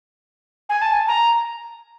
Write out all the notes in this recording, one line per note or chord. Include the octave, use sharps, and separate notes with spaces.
G#5
A5
G#5
A#5